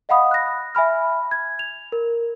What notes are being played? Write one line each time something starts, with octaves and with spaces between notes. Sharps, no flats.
D#5 F5 F#5 B5 D#6
F#6 A#6
E5 G#5 B5 F6
G#6
F7
A#4